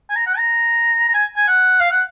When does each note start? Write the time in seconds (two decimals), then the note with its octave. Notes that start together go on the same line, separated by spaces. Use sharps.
0.09 G#5
0.15 A#5
0.27 F#5
0.37 A#5
1.08 A#5
1.14 G#5
1.36 G#5
1.47 F#5
1.80 F5
1.91 F#5